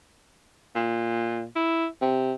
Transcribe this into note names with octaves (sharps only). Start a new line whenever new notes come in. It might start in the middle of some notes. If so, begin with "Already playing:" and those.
A#2
E4
C3